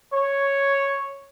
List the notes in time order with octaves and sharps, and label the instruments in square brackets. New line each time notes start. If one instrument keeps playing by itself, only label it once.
[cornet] C#5